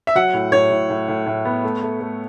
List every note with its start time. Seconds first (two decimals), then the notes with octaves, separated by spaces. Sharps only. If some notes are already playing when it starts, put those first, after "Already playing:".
0.07 E5
0.15 F#3 F#5
0.33 A2
0.52 A2 C#5
0.71 A2
0.90 A2
1.08 A2
1.26 A2
1.45 B3
1.64 A3
1.82 A3
2.00 A3